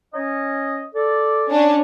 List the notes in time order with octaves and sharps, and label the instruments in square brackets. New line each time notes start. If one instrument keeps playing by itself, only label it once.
[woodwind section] C#4 C#5 D#5
A4 D5
[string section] C#4 D4